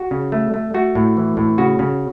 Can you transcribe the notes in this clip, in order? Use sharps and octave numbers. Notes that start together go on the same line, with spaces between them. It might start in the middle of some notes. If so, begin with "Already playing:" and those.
Already playing: F#4
C#3
A3
A3
A3 F#4
A2
E3
A2
C#3 F#4
C#3